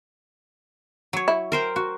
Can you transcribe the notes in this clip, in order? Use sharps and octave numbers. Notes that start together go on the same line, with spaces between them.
F#3 C#5
E4
A#4 C5 G5
F#4